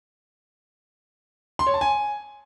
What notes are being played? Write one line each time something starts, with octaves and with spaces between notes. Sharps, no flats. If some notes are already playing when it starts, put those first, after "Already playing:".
C6
C#5
A5
G#5